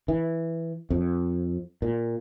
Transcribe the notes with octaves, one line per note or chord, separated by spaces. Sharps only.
E3
F2
A#2